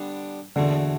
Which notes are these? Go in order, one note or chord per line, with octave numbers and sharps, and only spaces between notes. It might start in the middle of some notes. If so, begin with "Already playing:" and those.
Already playing: D3 G3 B3 D4
E2 B2 D3 A3